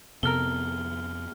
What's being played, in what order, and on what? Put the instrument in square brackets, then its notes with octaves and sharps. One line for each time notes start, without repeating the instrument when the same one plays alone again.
[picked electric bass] F2 B3 [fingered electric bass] C3 [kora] A4 A#4 [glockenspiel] F6 G7